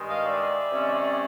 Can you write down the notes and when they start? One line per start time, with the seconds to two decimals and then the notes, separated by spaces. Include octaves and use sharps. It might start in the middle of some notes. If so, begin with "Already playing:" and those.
Already playing: G2 D#3 G#3
0.08 D#5 F5
0.24 D5 E5
0.72 C3 D#3 G#3 C#4